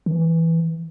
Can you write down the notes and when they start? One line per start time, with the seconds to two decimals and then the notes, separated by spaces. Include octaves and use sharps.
0.06 D#3
0.11 E3